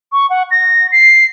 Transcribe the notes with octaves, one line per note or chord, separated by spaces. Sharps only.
C#6
F#5
A#6
C7